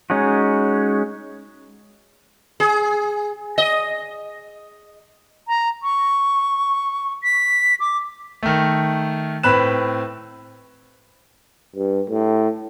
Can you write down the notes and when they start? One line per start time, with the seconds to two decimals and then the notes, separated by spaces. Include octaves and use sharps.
0.10 G#3 C#4 D#4 F#4
2.60 G#4
3.58 D#5
5.48 A#5
5.83 C#6
7.23 B6
7.80 D6
8.43 D#3 A3
9.43 A2 C4 B4 B5 F#6 E7
11.76 G2
12.10 A2